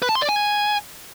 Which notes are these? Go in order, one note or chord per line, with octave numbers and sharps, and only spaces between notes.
B4
A5
C6
D5
G#5